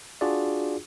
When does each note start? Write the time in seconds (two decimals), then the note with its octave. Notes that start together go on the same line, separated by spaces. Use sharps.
0.21 D4 F4 F#4 G#4 D5